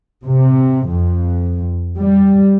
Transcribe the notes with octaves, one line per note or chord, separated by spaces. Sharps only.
C3
F2
G3